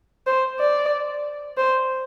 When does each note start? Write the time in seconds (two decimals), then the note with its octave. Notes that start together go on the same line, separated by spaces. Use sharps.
0.27 C5
0.59 D5
1.57 C5